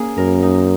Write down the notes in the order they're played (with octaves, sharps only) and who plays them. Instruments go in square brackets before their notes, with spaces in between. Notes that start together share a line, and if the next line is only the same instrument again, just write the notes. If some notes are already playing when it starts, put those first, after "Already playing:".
Already playing: [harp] A#3 C#4 G#4
[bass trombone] F#2 [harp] A#4
[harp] D#4